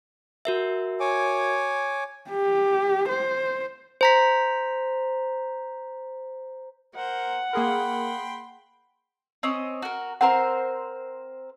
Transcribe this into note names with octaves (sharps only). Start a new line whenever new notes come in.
F#4 A#4 E5
C#5 G#5 D6
G4
C5
C5 A#5 B6
A#4 C5 F#5
A#3 G#4 A#4 G5 B5 C6
C4 C#4 D#5
F#4 A#4
C4 A#4 C5 F#5